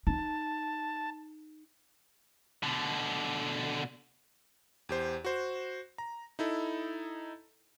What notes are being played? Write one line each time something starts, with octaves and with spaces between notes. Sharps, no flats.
D#4 A5
B2 D3
E2 G4 C5
F#4 C5
A#5
D#4 E4 A4